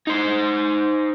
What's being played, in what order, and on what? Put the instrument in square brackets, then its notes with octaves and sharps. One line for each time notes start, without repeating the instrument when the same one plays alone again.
[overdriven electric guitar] D#4 C5